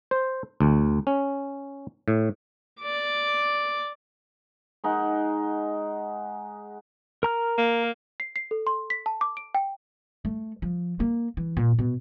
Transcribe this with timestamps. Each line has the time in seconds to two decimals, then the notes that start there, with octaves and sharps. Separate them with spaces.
0.11 C5
0.60 D2
1.07 C#4
2.08 A2
2.81 D5 D6
4.84 G#3 D#4 F#5
7.23 A#4 A#5 F6
7.58 A#3
8.20 C7
8.36 C7
8.51 A4
8.67 C6
8.90 B6
9.06 A5
9.21 D6
9.37 D7
9.55 G5
10.25 A3
10.62 F3
11.00 A#3
11.37 E3
11.57 A#2
11.79 B2